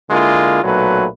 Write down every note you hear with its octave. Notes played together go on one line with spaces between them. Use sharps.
D3 G#3 A#3 E4 F4
B1 A#2 F#3 A3 B4